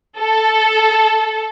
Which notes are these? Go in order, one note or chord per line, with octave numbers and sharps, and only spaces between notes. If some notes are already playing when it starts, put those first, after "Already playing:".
A4